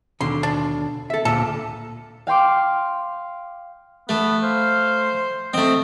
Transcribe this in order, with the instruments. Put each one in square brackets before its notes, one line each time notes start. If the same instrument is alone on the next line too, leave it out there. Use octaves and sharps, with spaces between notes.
[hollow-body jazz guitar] D#2 B2 D3 [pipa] C6
[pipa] D4
[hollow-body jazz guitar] A4 E5
[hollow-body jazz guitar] D2 A#2 [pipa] A4
[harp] F5 G5 C6 D6
[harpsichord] A3 [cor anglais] B3
[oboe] C5 [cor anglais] F5
[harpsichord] A3 C4 [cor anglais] D#5